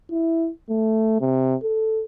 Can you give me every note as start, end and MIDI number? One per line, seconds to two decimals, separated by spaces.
0.11 0.50 64
0.70 1.19 57
1.21 1.55 48
1.63 2.03 69